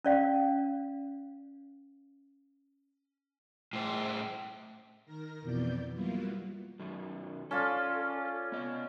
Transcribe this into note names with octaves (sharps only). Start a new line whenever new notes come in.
C#4 D5 F5
A2 C5
D#3 A#4 A#6
F2 B2 E3 B3 D5 G6
F#3 G3 A#3 B3 E4 F4
F#2 D#3 F#3
C#4 F4 A4 D5
B3 D#5